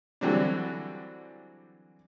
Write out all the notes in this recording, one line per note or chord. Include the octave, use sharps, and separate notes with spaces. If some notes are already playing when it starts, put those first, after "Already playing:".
D3 E3 F#3 G3 C4 D4